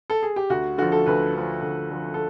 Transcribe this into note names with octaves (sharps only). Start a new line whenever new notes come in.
A4
G#4
G4
D2 F#4
D3 F3 F#4
A4
D2 B4
D3 F3
D2
D3 F3
A4